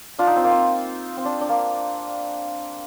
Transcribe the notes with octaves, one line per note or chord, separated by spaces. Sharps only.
D4 F4
D#4
C4
A#3
C4
C4
D4
D4
A#3